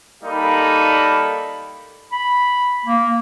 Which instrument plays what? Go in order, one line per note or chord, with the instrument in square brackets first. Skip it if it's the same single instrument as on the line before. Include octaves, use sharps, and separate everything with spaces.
[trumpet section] G3 A#3 D#4 A4 B5
[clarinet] B5
A#3